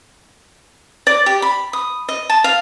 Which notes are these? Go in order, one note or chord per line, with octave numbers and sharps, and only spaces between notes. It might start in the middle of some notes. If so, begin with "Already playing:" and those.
D5
G4
B5
D#6
D#5
A5
F5